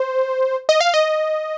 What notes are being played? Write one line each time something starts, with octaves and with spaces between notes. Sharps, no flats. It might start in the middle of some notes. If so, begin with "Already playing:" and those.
Already playing: C5
D#5
F5
D#5